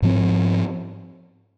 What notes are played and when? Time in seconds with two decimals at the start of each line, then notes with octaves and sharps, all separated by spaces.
0.02 G#2 F3 C4